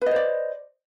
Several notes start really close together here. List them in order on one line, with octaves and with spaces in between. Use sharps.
B4 D#5 C5 D5